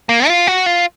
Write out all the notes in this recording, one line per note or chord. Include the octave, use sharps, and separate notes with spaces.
A#3
F4
F#4
F4